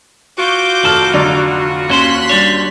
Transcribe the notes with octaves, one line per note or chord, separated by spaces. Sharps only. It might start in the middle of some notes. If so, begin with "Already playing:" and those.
F4 F#4 D6 G6
F1 D#3 A4 F6
F1 D3 D#4 D5
D#2 C#4 C5 C6 F#6 B6
G3 D4 C#5